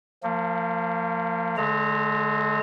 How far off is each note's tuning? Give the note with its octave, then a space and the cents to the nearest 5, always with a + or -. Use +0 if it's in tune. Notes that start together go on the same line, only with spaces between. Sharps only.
F3 +0 A#3 -40
D3 +0 G#3 +40 A#5 -25